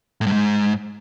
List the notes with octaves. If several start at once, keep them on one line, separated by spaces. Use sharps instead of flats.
A2
G2
G#2